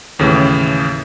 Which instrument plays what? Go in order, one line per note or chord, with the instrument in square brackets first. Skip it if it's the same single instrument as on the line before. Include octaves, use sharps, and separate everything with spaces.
[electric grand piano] D#2 A2 C#3 E3